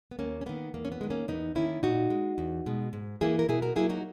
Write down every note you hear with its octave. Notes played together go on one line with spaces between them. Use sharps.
B3
D#2 A#3 C#4
C#4
D#3 A#3 B3
E2 A#3
C#4
B3
D#3 G#3
A#3 C#4
E2 B3 D#4
D#3 A#3 C#4 E4
A#2 D#4 F#4
G#3
E2
B2 G#3
G#2
E3 A#3 E4 G#4
A#4
B2 E4 G#4
F#4 A#4
F#3 A#3 E4 G#4
D#4 F#4